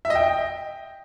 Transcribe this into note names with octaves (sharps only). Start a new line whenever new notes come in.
E5
D#5
G5